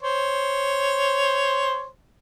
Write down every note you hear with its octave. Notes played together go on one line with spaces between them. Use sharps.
C5 C#5